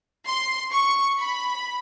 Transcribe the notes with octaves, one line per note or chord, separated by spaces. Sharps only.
C6
C#6
B5